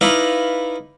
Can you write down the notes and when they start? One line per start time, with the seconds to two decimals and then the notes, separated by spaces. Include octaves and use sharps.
0.01 D#4 E4 B4 D5 F5